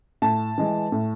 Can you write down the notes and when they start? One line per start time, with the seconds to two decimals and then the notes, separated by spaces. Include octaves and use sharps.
0.22 A2 A5
0.58 E3 G#3
0.92 A2